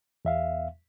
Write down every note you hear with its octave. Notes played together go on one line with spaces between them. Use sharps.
E2 E5 F5